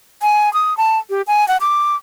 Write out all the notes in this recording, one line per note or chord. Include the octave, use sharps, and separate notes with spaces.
G#5
D#6
A5
G4
G#5
F#5
D6